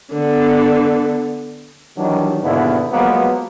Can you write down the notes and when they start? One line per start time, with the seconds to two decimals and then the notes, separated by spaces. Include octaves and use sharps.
0.12 D3 B3
1.96 D#3 E3 F#3 G3 D4 D#4
2.42 D#2 G#2 B2 D3 B3 E4
2.92 F3 F#3 G#3 A#3 B3